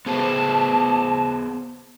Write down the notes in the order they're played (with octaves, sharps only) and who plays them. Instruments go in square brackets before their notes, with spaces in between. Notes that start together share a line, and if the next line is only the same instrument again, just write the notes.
[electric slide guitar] B3 G#4 C5 [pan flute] A5